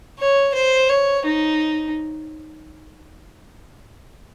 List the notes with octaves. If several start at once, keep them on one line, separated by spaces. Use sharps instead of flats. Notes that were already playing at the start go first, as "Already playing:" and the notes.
C#5
C5
C#5
D#4